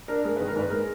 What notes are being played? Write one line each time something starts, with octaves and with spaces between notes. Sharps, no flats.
D4 A#4
G#3 A#4
D#3 B4
A#4
G#2 B4
G#3 A#4